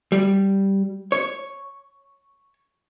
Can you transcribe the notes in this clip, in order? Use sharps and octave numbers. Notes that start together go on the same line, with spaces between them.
G3
C#5